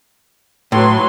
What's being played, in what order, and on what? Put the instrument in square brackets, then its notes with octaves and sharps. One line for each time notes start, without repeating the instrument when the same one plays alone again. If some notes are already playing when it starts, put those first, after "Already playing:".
[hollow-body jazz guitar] A2 [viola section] F#3 B4 C6